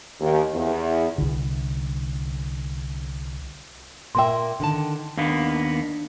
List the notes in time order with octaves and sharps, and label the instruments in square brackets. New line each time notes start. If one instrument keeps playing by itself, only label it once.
[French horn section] D#2
E2
[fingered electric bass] C2 D3
[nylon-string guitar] A#2 A#3 E5 [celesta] G5 C6
[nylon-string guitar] D3 D#3 A5
[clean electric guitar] D#2 A#3 B3 [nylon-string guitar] D4